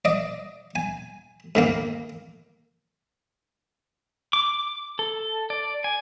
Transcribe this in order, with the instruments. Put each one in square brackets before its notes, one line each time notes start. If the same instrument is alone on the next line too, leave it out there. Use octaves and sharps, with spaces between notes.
[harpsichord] D5 D#5
G#5
G#2 D#3 A#3
[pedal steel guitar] D6
A4
D5
G#5